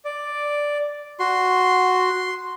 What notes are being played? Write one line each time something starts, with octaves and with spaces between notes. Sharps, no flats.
D5
F#4 C6